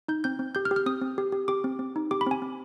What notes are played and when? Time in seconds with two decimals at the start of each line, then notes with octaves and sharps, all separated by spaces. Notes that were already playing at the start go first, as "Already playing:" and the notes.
0.08 D#4 G6
0.24 C4 G6
0.39 C4
0.55 G4 G6
0.65 F6
0.71 G4
0.76 F6
0.86 C4 D#6
1.01 C4
1.18 G4
1.32 G4
1.48 G4 D6
1.64 C4
1.79 C4
1.96 D#4
2.11 G4 D6
2.21 B5
2.27 C4 G#5
2.42 C4